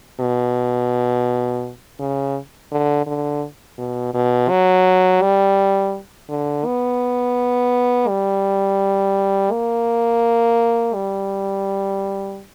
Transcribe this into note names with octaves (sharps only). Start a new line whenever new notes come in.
B2
C#3
D3
D3
B2
B2
F#3
G3
D3
B3
G3
A#3
G3